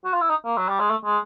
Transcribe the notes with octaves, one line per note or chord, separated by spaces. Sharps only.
F#4
F4
E4
D#4
A#3
F#3
G3
G#3
A3
G#3